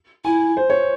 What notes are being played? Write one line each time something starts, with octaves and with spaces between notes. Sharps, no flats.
E4 G#5
C5
C#5